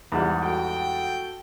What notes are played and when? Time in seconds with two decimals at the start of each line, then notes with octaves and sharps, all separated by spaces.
0.12 E2 G#2 G3
0.41 F#4 A4 G5